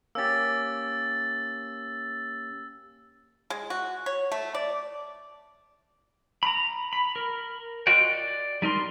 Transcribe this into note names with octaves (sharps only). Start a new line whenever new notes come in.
A#3 C#4 G4 E6 A6
G#3
F#4
C#5
A3
D5
A#5 B5
B5
A#4
F4 F#4 D#5 F#5 G5
D5
G3 D#4 A#4 C6